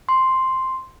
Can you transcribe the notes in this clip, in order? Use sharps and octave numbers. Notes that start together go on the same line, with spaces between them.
C6